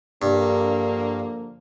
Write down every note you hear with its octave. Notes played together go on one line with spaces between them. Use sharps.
G2 D3 F3 A#3